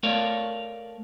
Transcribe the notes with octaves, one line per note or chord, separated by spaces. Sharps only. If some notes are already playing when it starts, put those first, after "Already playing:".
A3 A#4 C#5 D5 F5